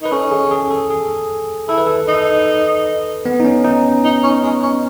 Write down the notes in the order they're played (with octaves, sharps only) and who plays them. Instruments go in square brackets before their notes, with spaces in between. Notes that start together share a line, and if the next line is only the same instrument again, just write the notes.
[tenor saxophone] D#4 [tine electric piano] B4
[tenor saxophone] C#4 [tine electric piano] A4
[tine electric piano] G#4
G#4
A4
G#4
[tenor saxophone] E4 [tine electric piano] A4
[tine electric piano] B4
A4
[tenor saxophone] D#4
[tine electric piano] B3
D#4
C#4
D#4
[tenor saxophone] D#4
C#4
G#3
C#4